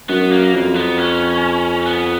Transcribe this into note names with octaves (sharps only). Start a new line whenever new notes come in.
F#2 B3
A#3
F2
B3
C#4
B3